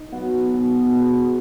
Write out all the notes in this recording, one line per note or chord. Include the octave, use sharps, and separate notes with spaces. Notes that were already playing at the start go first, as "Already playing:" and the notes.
Already playing: D#4
F#3 B3 F#4
B2 B3 G#4
G#3 B3 G#4